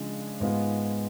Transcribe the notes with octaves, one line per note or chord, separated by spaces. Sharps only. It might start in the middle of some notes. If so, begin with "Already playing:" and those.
Already playing: C#3 F3 G#3 D4
G#2 G#3 B3 F4